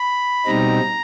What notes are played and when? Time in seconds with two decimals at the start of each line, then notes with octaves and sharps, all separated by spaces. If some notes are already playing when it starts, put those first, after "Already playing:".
Already playing: B5
0.46 B2 G3 C4 D#4 A#5